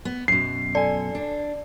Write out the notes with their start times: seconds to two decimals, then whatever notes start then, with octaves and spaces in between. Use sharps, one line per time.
0.05 B3
0.28 F#2 B2 C7
0.75 A4 D5 G#5
1.15 D4